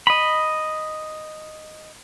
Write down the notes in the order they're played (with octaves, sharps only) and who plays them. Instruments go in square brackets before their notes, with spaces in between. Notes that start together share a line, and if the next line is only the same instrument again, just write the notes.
[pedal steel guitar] D#5 B5